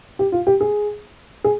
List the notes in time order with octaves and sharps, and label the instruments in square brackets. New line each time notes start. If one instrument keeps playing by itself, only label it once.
[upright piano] G4
F4
G4
G#4
G#4